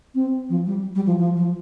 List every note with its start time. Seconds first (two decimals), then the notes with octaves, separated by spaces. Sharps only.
0.15 C4
0.49 F3
0.66 G3
0.95 G3
1.06 F3
1.19 F3
1.36 F3